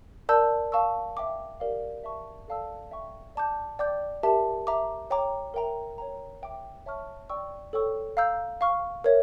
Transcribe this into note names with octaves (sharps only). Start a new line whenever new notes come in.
A#4 D5 A5 E6 G6
F5 A5 C#6 E6
E5 G5 D6
G4 A#4 D5 F5
E5 A5 C#6
A4 D5 F5 A5 E6
E5 G5 C#6
D5 A5 D6 G6
D5 G5 D6 G6
G4 A#4 E5 A5
E5 A#5 D6
C#5 G5 A#5 D6
A#4 E5 G5 A#5
C#5 G5 A#5
E5 G5 D6
C#5 E5 A5 C#6 F6
D5 G5 C#6 E6
A4 C#5 G5 C#6 E6
F5 A#5 E6 G6
F5 C#6 F6
A#4 C#5 E5